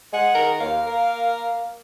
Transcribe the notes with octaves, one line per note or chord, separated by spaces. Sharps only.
G#3 G#4 F#5
D#3 A#4
D#2 A#3 C#5 F5
A#4